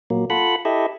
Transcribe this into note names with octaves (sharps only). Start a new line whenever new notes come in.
A#2 F#3 A#3
F4 A4 F#5 B5
E4 G4 A4 D#5 E5